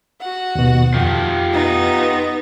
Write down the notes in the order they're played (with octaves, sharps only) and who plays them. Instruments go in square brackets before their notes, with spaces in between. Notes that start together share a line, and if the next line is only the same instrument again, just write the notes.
[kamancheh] F#4 F#5
[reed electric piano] D#2 B2
[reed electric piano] F2 [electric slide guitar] F4 G4
[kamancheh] B3 D#4